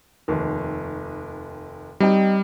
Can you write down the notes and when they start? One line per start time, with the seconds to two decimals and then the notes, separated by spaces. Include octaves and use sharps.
0.28 F1 D#2
2.00 G3 C4 D#4 G5